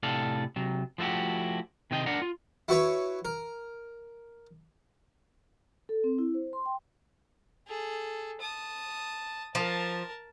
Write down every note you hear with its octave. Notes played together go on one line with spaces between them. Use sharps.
A2 C3 A4 D5 F5
C3 F#3
F3 A3 E4 F#4 G4
C3 D#3 C4 D#5 G5
D4 A#4 D5 F#5 A#5
F4
E4 F#4 B4 C#5
A#4
A4
C4
E4
C5
C6
G5
G#4 A4
A5 D#6
F3 A#4 A5